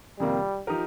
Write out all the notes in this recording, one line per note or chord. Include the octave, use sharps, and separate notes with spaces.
F2 C3 D#3 G3 A#3
F3 D#4 G4 A#4